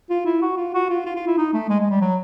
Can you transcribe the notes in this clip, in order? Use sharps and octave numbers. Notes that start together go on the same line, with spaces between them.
F4
E4
F#4
F4
F#4
F4
F4
F4
E4
D#4
A3
G#3
G#3
G3
F#3